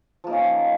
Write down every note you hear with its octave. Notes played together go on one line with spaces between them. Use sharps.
F3 A#3 C#4 D#4